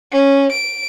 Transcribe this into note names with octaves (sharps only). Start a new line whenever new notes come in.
C#4
D7